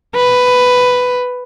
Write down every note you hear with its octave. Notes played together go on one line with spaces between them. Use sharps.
B4